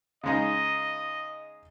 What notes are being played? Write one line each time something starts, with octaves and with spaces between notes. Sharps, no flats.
C#3 G#3 D#4 D#5